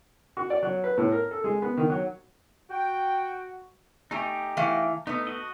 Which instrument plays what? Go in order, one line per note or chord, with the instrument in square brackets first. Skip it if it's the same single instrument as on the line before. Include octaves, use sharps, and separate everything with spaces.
[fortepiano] F#4
D5
F#3
B4
A2
A#4
A4
G#3
B3
D#3
F#3
[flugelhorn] F#4 [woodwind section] G5
[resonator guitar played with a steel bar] A3 G#5 A#5 [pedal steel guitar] D#4 G4
[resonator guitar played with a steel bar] E3 A3 F5
[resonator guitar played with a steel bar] A3 B3 [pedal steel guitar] D#4
[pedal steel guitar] F#4 D#5